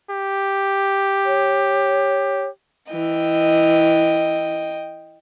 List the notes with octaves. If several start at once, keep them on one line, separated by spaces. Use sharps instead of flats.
G4
C#5
E3 D#5 G5